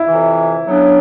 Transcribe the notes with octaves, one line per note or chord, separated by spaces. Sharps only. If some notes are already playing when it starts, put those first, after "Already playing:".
Already playing: E4
F2 C3 E3
C#3 F#3 B3 D4